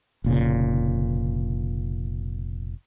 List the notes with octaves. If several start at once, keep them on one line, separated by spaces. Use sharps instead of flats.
F1 A#2 C#3